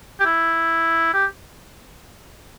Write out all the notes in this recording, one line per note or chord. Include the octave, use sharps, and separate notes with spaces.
G4
E4
G4